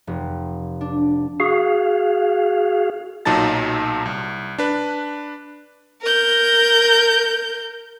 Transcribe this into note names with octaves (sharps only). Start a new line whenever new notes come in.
F1
D4
F#4 G#4 F5
B1 A#2 F#3 D#4 A5 A6
C2
D4 B4
A#4 G6